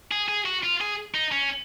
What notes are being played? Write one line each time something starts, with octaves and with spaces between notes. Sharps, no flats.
G#4
G#4
F#4
F4
G#4
D#4
C#4